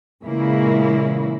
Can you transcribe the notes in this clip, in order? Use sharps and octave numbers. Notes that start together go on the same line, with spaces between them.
A#2 C#3 E3 G#3 A#3 E4